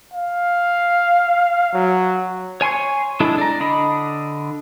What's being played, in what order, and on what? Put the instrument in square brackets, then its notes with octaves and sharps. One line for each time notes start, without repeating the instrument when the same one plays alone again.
[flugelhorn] F5
F#3
[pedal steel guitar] C#5 G#5 C6 C#6
G#3 D4 E4 A4
D5 A#5
D3 D4 D#5 B5